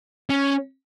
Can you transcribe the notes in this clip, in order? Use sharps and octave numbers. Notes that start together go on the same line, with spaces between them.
C#4